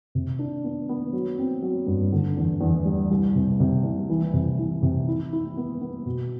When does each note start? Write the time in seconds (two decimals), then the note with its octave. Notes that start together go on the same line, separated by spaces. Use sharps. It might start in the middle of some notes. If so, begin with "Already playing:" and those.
0.15 C3
0.39 D4
0.64 B3
0.89 B3
1.13 F#3
1.39 C4
1.62 F#3
1.87 G2
2.12 D3
2.37 E2
2.61 E2
2.85 G3
3.11 C2
3.35 C3
3.60 C3
3.84 C2
4.10 E3
4.34 C3
4.59 E3
4.82 C3
5.08 E4
5.33 E4
5.57 B3
5.81 B3
6.06 B2